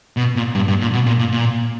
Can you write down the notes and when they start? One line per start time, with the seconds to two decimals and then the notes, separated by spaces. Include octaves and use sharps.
0.17 B2
0.36 A#2
0.55 G2
0.68 G2
0.81 A#2
0.93 B2
1.06 A#2
1.19 A#2
1.32 A#2